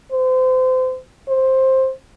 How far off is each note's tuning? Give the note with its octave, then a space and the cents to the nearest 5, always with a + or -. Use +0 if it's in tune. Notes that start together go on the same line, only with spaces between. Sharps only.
C5 -30
C5 +10